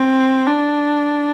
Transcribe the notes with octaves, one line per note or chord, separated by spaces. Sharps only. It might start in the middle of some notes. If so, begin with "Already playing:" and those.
Already playing: C4
D4